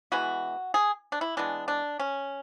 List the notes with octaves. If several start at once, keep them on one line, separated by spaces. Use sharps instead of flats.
E3 G#3 B3 F#4
G#4
D4
E4
E3 G#3 B3 D4
D4
C#4